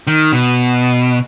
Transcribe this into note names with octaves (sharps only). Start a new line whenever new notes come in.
D#3
B2